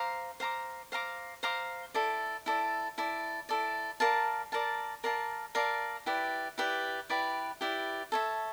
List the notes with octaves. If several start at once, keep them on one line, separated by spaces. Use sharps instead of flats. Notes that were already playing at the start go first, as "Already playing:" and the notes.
Already playing: C5 F5 A#5 D6
C5 F5 A#5 D6
C5 F5 A#5 D6
C5 F5 A#5 D6
E4 A4 D5
E4 A4 D5
E4 A4 D5
E4 A4 D5
A#4 D5 F5 A5
A#4 D5 F5 A5
A#4 D5 F5 A5
A#4 D5 F5 A5
E4 G4 B4 D5
E4 G4 B4 D5
E4 G4 B4 D5
E4 G4 B4 D5
A4 C#5 E5